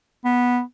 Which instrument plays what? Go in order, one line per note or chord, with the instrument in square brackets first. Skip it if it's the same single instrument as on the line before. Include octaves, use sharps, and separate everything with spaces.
[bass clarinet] B3